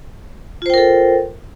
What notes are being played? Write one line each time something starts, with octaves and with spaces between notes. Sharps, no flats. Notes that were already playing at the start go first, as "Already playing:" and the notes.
F4 A4 A#4 C5 G5